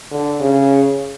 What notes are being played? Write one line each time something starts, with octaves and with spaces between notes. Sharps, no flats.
D3
C#3